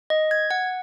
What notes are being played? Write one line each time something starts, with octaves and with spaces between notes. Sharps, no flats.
D#5
G#6
F#5